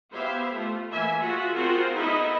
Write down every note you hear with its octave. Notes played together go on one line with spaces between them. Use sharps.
B3 E4 G4 C5 E5 F5
A3 F4
E3 A3 A#3 E5 G#5
F4 F#4 G#4 E5
C4 F4 F#4 G#4 A#4 C5
B3 D#4 E4 A4 D#5 E5